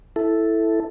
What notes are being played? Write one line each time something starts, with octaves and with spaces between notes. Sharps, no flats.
E4 A4